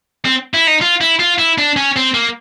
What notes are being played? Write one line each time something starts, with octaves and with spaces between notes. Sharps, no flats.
C4
E4
D#4
F4
E4
F4
E4
D4
C#4
C4
A#3